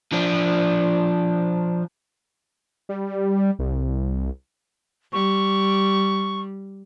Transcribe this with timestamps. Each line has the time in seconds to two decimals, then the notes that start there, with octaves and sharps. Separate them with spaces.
0.13 F3 D4
2.89 G3
3.59 C2
5.13 G3 C#6